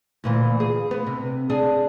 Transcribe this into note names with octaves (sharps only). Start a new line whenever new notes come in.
D2 A#2 E3
G#4
B3
C3
D4 G#4